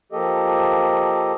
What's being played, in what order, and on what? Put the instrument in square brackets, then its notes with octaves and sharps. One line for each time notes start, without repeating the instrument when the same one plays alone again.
[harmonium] F3 A#3 G4 A4 D#5